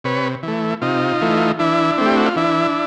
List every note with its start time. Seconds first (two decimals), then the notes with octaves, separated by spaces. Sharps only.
0.04 C3 B4 C#5
0.43 E3 A3
0.82 C3 D#4 F4
1.21 E3 A3
1.59 E3 D4 E4
1.98 A3 C4
2.06 G4
2.17 F#4
2.26 F4
2.36 E3 D4 E4